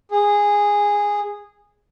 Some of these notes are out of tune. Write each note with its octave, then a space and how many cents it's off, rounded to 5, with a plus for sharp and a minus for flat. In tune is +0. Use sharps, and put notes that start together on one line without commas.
G#4 -10